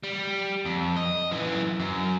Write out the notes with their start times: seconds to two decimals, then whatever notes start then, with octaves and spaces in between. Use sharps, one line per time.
0.03 G3
0.65 F2
0.96 D#5
1.31 F#2 E3
1.79 F#2